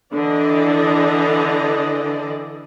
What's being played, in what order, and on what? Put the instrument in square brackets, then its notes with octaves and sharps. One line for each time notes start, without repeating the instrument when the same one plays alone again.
[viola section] D3 E3 D4 A4 D5 D#5